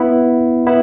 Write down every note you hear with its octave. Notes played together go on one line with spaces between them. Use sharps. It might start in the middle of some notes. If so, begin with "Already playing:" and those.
Already playing: B3 E4
B3 E4